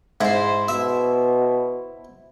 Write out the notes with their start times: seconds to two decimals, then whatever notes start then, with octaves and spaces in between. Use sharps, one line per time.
0.21 G#2 E4 C5
0.68 B2 E5